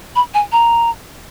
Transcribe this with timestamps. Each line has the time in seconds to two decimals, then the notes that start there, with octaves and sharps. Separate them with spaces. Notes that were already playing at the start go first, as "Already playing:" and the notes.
0.16 B5
0.34 G#5
0.52 A#5